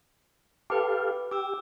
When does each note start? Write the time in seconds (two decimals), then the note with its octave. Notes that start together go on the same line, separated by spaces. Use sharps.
0.70 G4 A4 B4 F5 D6
1.31 G4 D6 E6